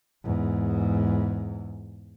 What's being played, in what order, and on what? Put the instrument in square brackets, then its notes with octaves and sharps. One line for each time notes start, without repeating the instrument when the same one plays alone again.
[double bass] E2 G#2